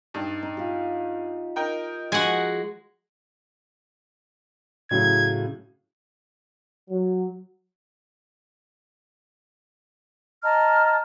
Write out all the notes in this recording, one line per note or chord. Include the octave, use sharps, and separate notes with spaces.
G2 D#4 D5
D#4
F4 G4
D#4 A#4 G5
F3 G#3 F#4 F#5 G#5
A2 C#3 F#3 G#6
F#3
D#5 A5 A#5 F6